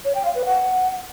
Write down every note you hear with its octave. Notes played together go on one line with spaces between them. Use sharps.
C#5
G5
F5
B4
F#5